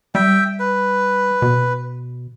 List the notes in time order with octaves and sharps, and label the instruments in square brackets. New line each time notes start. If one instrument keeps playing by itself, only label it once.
[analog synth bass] G3 [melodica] E5 G5
[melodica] B4
[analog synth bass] B2